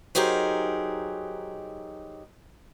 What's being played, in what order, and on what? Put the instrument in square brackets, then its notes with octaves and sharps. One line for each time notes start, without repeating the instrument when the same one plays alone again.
[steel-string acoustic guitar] F#3 D#4 G4 G#4 A#4 C5